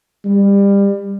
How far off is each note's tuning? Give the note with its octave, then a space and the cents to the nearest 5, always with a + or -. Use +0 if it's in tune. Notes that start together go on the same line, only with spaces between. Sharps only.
G3 +25